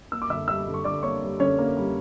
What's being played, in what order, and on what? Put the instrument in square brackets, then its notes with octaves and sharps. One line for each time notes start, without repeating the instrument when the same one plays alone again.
[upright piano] A#3 E6
D6
D3 E5 E6
G3 E5 E6
D3
C#6
D3 D5 D6
A#3 C#5 C#6
G3
D3 C#4 C#5
A#3
G3